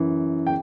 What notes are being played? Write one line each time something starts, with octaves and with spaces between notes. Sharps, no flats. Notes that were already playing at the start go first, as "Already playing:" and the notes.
Already playing: F#2 E3
G5